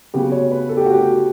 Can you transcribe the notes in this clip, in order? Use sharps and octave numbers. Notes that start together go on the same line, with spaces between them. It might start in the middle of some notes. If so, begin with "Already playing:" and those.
C#3 F#3 B3 G4
C#5
B4
A4
G4
F#4
G4